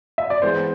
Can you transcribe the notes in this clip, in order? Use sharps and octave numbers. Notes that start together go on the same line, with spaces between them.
E5
D5
E3 G#3 B3 C5